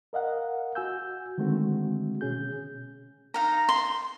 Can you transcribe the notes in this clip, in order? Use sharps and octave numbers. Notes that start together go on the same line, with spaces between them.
A#4 D#5 F5 F#5
F#4 G#5 E6 G6
D3 D#3 G#3 A3 C4 F#4
B2 C#4 G#4 G6
D#4 F5 A#5
C6